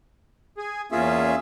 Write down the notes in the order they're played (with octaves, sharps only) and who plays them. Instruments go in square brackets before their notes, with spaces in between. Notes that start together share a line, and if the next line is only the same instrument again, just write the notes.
[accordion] G#4
[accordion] E2 A#3 C#4 [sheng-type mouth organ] F4 G#4 E5